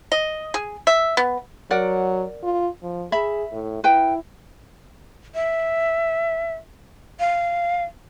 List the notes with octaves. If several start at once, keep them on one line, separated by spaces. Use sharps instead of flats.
D#5
G#4
E5
B3
F#3 A#4 D5 F#5
F4
F3
G#4 E5 B5
A2
E4 B4 G5
E5
F5